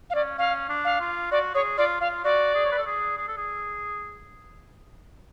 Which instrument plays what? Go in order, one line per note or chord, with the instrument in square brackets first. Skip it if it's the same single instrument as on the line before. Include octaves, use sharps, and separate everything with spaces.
[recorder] F5
[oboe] C#4 [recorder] D5
[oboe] C#4 [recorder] F5
[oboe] D4
[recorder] F5
[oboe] F4
[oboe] F#4 [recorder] D5
[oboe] G#4 [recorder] C#5
[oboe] F4 [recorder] D5
[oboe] F4 [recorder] F5
[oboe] F#4 [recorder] D5
[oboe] G#4
C#5
B4
A4
G#4
G#4
A4
G#4